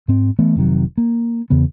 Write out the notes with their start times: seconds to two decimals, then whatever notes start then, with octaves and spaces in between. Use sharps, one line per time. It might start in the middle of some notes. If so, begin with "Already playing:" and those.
0.08 G#2 C4
0.39 E3 A3 B3
0.56 F1 C3 D#3 F#3
0.98 A#3
1.50 E2 C#3 B3